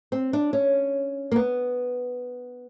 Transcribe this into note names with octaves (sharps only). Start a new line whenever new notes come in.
C4
D4
C#4
A#3
B3